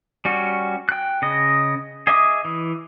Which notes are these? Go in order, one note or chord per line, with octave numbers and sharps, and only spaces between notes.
G3 C#4 F#4
G5 F#6
C#3 D#5
G#4 D#5 E5 D6 D#6
E3